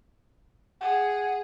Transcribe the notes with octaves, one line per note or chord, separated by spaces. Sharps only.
G#4 F#5